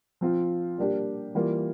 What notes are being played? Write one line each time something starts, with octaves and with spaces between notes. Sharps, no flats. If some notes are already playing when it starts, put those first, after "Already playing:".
F3 C4 F4
G3 A#3 D4 G4
E3 G3 A#3 F4